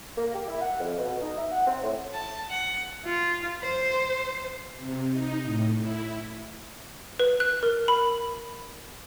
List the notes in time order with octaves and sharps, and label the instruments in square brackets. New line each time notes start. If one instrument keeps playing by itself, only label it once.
[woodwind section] A#3
G4
E4
F#5
F2
B2
D#4
E5
F#5
C4
A2
[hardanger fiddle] A5
F#5
[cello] F4
C5
[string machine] C3
D#4
A2
E4
[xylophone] B4
F#6
A#4
B5